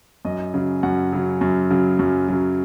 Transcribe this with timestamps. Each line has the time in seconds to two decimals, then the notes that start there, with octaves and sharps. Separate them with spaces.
0.25 F#2 D#5
0.54 C#3 F#3
0.83 F#2 F#5
1.13 C#3 F#3
1.41 F#2
1.71 C#3 F#3
1.99 F#2
2.28 C#3 F#3